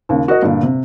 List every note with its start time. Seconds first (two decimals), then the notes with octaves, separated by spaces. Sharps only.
0.09 D#2 C#3
0.28 F#4 A#4 D#5
0.42 G2 A#2 D3
0.63 C3